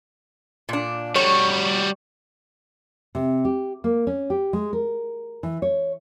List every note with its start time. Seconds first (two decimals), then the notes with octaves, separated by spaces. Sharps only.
0.69 A#2 D4
1.16 G3 F#4 C#5
3.15 C3
3.45 G4
3.84 A#3
4.07 C#4
4.30 G4
4.53 G#3
4.73 A#4
5.43 E3
5.62 C#5